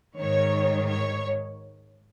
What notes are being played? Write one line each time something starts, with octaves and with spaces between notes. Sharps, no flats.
G#2 D#3 C#5
C#5